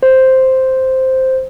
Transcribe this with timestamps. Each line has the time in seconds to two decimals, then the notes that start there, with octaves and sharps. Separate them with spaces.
0.03 C5